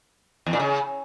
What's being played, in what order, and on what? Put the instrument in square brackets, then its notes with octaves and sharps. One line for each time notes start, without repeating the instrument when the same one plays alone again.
[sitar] E2
A#2
C#3